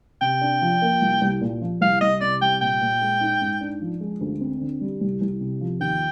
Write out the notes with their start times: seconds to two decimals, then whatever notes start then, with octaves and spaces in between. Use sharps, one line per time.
0.21 C3 G5
0.41 D4
0.62 F3
0.82 A#3
1.01 C2
1.21 C2
1.41 A#2
1.61 F3
1.81 C2 F5
2.01 C2 D#5
2.21 C3 D5
2.41 G3 G5
2.61 A#2 G5
2.81 A#2
3.01 G#3
3.21 D#4
3.41 G#2
3.61 D4
3.81 F3
4.01 G#3
4.21 D2
4.41 C4
4.61 D3
4.81 G3
5.01 C2
5.21 C2
5.41 C3
5.61 F3
5.80 D#2 G5